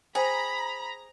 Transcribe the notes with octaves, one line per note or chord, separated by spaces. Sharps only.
G#4 C5 G5 A#5 B5